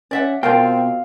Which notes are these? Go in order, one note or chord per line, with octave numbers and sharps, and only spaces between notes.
C#4 D5 E5 F#5
B2 C4 F4 A#4 D5 F5 G5